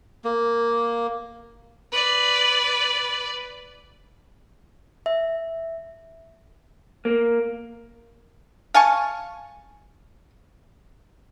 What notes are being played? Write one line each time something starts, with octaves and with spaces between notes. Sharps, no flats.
A#3
B4 D5
E5
A#3
F5 G#5 A5 C#6